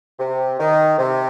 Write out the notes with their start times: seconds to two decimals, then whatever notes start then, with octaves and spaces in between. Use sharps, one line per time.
0.19 C3
0.59 D#3
0.99 C3